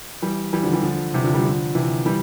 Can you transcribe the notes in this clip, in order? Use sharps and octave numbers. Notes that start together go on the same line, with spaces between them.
E3 G3
E3 G3
D3 F3
E3 G3
D3 F3
C3 E3
D3 F3
E3 G3
D3 F3
C3 E3
E3 G3